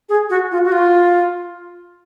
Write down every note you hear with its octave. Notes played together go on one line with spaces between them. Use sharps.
G#4
F#4
F4
F#4
F4